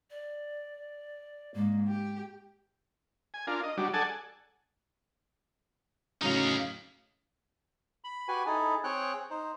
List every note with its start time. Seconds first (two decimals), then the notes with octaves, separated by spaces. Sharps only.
0.10 D5
1.54 G#2 A#3
1.88 G4
3.34 G#5
3.47 D4 F4 A#4
3.63 D#5
3.77 F#3 G3 D4
3.93 G#4 A4 D5 F#5 G#5 A5
6.21 A2 C#3 F#3 D#4 F5
8.04 B5
8.28 F#4 G4 B4 G#5
8.46 D#4 E4 G#4 A4
8.84 C4 G#4 C#5 G5 F#6
9.30 D#4 C5